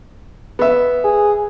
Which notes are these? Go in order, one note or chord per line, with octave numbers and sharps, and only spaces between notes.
B3 E5
G#4